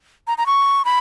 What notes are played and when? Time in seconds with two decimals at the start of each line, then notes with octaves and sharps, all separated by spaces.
0.27 A#5
0.38 A#5
0.46 C#6
0.85 B5